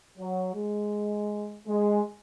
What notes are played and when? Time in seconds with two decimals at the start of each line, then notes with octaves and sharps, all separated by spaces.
0.18 F#3
0.55 G#3
1.67 G#3